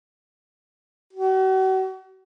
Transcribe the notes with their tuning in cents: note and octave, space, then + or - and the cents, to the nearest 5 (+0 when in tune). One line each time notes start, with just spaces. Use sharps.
F#4 +40